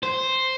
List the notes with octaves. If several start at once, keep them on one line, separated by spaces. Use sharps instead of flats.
C5